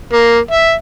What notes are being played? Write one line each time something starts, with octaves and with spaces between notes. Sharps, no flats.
A#3
E5